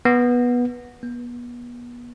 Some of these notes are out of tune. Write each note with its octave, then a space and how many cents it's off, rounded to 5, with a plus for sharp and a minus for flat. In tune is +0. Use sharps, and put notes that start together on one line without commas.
B3 -15
B3 -35